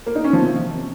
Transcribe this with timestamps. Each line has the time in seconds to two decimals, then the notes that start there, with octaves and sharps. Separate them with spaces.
0.06 A#3
0.15 D#4
0.24 C#4
0.33 F3
0.42 C3